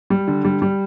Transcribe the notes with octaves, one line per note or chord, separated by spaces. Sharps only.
G3
D3
G3
G3